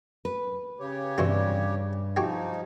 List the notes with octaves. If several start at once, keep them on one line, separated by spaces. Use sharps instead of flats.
B4
C#3 G4 C#5
G2 C3 E3 F#4
F3 D#4 F#4 G4 G#5